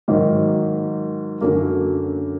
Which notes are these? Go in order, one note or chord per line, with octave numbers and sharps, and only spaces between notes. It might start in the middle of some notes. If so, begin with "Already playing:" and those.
G#2 D#3 F#3 A#3
F#2 D3 F#3 A#3